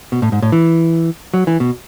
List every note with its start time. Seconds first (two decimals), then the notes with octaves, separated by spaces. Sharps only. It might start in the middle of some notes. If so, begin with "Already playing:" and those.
0.12 B2
0.22 A2
0.32 G#2
0.42 A2
0.52 E3
1.34 F#3
1.47 E3
1.60 B2